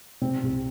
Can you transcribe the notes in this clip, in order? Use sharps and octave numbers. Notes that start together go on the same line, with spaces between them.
C3 C4
C2